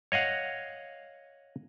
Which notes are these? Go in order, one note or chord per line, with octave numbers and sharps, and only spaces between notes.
C#5 D#5 F5 F#5